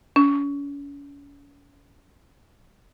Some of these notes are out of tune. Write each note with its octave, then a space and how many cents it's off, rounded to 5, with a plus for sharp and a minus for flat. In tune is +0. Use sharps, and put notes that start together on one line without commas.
C#4 +40